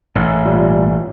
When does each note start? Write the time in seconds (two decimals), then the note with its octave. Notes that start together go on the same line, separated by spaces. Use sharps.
0.15 A1 G#2
0.45 A#2 G3